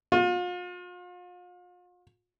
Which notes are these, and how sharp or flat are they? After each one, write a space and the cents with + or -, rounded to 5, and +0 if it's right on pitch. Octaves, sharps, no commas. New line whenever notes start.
F4 +40